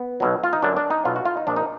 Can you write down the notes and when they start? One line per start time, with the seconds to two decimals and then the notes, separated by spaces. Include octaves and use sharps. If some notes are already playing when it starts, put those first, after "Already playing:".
Already playing: B3
0.20 B1 B2 F#3
0.44 F4
0.53 D#4
0.62 F#2 D3 F#3 D4
0.77 D4
0.90 D#4
1.05 B1 B2 F#3 F4
1.16 F#4
1.25 F4
1.37 D#4
1.47 A#1 A#2 F3 D4
1.56 D#4